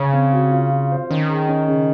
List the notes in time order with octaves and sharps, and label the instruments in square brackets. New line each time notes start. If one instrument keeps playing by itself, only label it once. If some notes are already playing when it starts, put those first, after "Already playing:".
Already playing: [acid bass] C#3 [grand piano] C#5
[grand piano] C4
F#4
F4
F4
C5
[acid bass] D#3 [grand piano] C#4
[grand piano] G#4
C#4
C#3